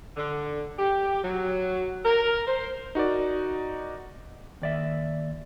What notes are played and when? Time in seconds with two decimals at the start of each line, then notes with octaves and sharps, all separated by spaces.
0.17 D3
0.79 G4
1.23 F#3
2.05 A#4
2.47 C5
2.95 D#4 F#4 A#4 D5
4.62 D#2 D5 E5